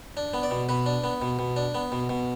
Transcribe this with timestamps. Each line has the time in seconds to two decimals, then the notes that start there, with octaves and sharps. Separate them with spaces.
0.17 D4
0.34 B3
0.43 D5
0.51 B2
0.69 B2 B4
0.86 D4
1.04 B3
1.22 B2
1.39 B2
1.56 D4
1.75 B3
1.92 B2
2.09 B2